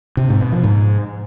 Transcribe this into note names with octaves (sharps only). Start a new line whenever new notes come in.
C3
G#2
B2
F3
G#2